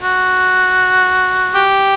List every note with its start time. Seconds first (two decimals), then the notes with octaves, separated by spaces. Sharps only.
0.01 F#4
1.55 G4